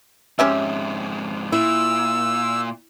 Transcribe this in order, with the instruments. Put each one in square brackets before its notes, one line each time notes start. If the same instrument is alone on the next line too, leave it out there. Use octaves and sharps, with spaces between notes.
[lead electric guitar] F2 G#2 [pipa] C#4 G4 E5
[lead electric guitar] A#2 [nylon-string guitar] E4 [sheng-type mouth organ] E6